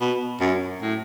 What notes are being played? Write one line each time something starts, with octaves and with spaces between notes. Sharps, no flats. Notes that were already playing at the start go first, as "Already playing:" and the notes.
B2
F#2
A2